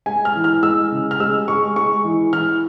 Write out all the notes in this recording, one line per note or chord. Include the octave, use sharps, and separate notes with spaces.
G#3 G#5
F6
E3
F6
G#3 E6
C#3
F6
G#3 E6
G#3 C#6
G#3 C#6
E3
E3 F6